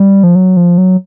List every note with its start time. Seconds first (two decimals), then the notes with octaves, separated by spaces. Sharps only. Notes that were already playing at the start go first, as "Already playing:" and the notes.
Already playing: G3
0.23 F3
0.35 F#3
0.57 F3
0.78 F#3